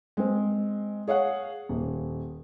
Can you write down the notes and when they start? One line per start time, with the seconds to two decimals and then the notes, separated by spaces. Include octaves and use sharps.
0.17 G#3 C4
1.07 G#4 C#5 F5 F#5
1.69 D#1